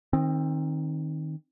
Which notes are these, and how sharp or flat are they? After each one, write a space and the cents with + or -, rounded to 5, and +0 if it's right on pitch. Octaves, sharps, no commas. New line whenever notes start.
D#3 +0 C4 +25